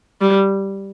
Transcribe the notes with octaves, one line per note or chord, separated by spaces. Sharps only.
G3